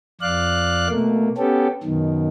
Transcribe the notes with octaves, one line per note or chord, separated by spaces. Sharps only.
F2 D5 F5 F#6
B2 A3 A#3
B3 C#4 G4 A4
F#2 B2 D#3